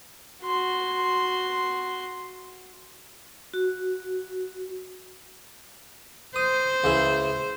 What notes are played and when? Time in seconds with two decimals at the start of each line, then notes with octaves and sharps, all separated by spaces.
0.44 F#4 C6
3.54 F#4
6.36 C5 D#6
6.84 C#2 C#3 E4